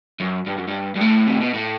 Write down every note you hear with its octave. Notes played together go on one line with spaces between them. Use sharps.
F#2
G2
F#2
G2
G2
A2
C3
B2
A2